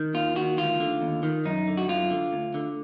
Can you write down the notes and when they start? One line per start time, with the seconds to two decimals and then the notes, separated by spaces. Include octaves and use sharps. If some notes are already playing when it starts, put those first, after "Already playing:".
Already playing: D#3
0.14 D#2 F4
0.36 D#3 F#4
0.58 D2 F4
0.80 D3
1.02 D#2
1.23 D#3
1.45 F#2 D#4
1.67 D3
1.77 F#4
1.88 F#2 F4
2.10 D3
2.33 D2
2.54 D3